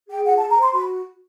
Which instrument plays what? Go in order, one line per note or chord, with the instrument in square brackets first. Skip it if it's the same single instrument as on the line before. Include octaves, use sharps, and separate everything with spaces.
[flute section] G#4 G5
F4 F#5
A5
G#4
A#5
C5 C6
F#4 B5